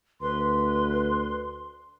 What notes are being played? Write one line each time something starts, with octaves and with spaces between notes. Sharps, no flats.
D2 B4 C6